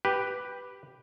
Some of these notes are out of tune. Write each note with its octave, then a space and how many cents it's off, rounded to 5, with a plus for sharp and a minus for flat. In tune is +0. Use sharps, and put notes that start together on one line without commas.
G4 +0 B4 +0